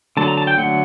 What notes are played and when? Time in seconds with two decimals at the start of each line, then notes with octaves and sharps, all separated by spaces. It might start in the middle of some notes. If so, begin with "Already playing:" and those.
0.17 D3 F#3 A3 A5
0.28 A#5
0.37 A5
0.47 G5
0.57 D3 F#3 A3 F#5